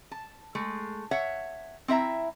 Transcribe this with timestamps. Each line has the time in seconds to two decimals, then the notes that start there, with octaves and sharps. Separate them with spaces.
0.11 A5
0.55 G#3 A3
1.11 C#5 E5 F#5
1.88 C4 E4 E5 A#5